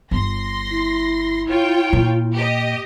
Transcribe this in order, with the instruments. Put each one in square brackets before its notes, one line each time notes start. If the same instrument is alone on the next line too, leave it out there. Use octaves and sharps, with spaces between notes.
[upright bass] G1 [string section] C6 A#6
[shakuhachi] E4
[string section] F4 C#5 G5
[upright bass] A#2
[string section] G4 D#5